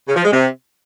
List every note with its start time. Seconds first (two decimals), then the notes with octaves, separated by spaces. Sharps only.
0.08 C#3
0.16 F3
0.24 G#3
0.32 C3